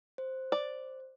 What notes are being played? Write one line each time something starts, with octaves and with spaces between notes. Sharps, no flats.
C5
D5